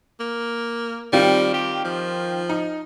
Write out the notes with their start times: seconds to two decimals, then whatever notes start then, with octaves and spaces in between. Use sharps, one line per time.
0.20 A#3
1.13 D#3 G3 C4 F4
1.54 G4
1.84 F3
2.49 D#4